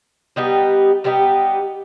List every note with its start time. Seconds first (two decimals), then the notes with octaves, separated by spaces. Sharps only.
0.36 G3 B3 D#4 G4
1.04 G3 B3 D#4 G4